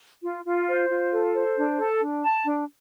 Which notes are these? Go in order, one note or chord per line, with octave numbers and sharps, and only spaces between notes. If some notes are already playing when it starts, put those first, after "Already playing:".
F4
F4
C5
F4
A4
C5
D4
A4
D4
A5
D4